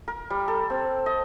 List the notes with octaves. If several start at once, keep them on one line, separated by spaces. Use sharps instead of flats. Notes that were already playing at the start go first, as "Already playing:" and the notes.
A#4
G3
A4
C4
D#5